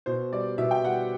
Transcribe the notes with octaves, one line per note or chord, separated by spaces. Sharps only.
B2 C5
G3 D5
B2 E5
G5
G3 F#5